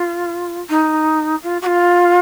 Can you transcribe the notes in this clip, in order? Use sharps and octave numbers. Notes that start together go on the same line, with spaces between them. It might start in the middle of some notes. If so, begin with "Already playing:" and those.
Already playing: F4
D#4
F4
F#4
F4